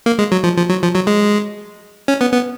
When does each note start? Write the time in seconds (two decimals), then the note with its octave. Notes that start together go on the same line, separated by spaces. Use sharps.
0.06 A#3
0.19 G#3
0.32 F#3
0.44 F3
0.57 F3
0.69 F#3
0.82 F3
0.94 F#3
1.07 G#3
2.08 C#4
2.21 B3
2.33 B3